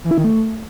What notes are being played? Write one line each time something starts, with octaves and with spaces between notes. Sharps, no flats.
E3
E4
D#3
A3